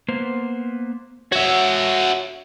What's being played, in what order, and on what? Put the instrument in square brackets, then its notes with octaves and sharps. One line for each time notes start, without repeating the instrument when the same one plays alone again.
[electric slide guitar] A#3 B3 C5
[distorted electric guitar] F#4 E5 [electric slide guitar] C#5 F#5